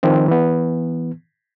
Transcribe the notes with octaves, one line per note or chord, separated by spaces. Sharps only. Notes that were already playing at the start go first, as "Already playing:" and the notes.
D#3 F3 C4
E3 B3